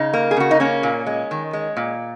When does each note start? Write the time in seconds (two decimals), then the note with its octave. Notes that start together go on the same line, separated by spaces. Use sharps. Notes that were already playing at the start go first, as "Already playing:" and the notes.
Already playing: C#3 D#4
0.13 A#3
0.31 G#4
0.37 C#3 F#4
0.51 D#4
0.60 A#3 C#4
0.83 A#2
1.06 G#3
1.31 D#3
1.53 G#3
1.77 A#2